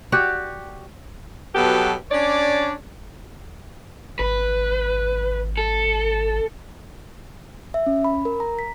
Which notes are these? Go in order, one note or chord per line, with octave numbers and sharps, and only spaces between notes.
F#4 G4 D5
B2 F#3 B3 G4 A4
C#4 D4 C#5 D5
G#1 B4
A4
E5
C#4
B5
A#4
A#5
B6